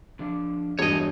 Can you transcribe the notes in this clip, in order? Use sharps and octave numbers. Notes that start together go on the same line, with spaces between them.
D3 F3 D4
E1 G2 C#5 D#5
A3 G#5